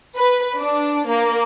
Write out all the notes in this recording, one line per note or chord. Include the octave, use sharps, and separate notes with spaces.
B4
D4
A#3